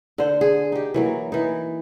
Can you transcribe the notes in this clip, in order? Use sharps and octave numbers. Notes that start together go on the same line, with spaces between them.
D3 C5 F#5
G#4
D#4 G4
E3 F#3 A#3
E3 D#4